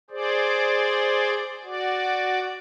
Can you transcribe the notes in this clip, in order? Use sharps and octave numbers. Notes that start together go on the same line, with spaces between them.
G#4 C5 D5
F#4 D5